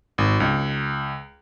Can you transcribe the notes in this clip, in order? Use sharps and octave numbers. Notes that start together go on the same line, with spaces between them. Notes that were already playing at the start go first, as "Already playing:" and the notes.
G#1
C#2